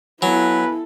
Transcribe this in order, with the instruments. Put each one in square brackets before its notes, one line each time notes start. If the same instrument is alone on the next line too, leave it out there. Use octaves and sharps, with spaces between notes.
[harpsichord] F#3 [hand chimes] B3 G#5 [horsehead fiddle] E4 A4 [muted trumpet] B4